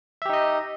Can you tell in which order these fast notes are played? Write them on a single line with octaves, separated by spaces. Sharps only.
E5 G4 D#4 D#5